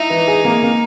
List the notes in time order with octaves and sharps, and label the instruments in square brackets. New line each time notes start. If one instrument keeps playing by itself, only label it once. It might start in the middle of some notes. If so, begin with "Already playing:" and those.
Already playing: [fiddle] D#4 [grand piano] E4
[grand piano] E3
G#4
A#3
A#3